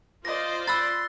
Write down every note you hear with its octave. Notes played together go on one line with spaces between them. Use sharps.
F4 C5 D5 D#5 A#6
B5 C6 E6 F#6 A6